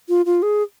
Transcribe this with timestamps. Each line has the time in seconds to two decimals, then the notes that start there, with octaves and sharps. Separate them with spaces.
0.09 F4
0.26 F4
0.42 G#4